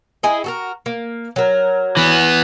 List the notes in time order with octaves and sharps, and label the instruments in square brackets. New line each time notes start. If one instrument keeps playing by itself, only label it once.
[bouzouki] E4 G#4 D#5
F#4 A4 A#4
A#3
F#3 A#4
[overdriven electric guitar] E3 B3